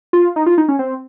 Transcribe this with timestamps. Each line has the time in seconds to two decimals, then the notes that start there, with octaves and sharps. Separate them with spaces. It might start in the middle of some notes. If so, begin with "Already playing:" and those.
0.13 F4
0.36 D#4
0.46 F4
0.58 D#4
0.68 C#4
0.79 C4